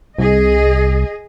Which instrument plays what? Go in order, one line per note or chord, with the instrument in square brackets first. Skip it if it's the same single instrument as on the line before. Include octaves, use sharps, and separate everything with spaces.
[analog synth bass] C2 [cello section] G#4 D#5